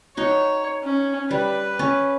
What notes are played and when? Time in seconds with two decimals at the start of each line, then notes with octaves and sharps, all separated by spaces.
0.17 D#4 F#4 C#5
0.83 C#4
1.31 G3 B4
1.79 C#4